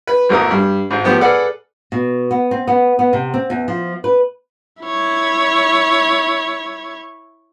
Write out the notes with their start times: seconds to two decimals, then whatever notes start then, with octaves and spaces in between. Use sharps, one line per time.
0.07 B4
0.29 G#1 E2 A3 E4 A#4 D#6
0.51 G2
0.90 G#1 G#2
1.04 A2 F3 B3 G4 C5
1.21 G#4 A4 B4 D5 F#5 F6
1.92 B2
2.31 B3
2.51 C4
2.68 B3
2.99 B3
3.13 C3
3.34 C4
3.50 E2
3.68 F3
4.04 B4
4.83 E4 C#5